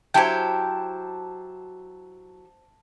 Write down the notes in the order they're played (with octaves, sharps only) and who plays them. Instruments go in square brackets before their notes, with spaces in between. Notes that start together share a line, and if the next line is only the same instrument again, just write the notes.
[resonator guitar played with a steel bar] F#3 E4 G4 [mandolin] C5 G5 [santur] A5